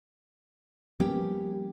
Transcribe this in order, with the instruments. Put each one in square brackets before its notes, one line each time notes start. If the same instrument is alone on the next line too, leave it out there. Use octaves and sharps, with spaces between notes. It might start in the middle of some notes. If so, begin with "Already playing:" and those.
[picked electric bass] F3 G3 A#3 [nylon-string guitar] B3 C#4 G4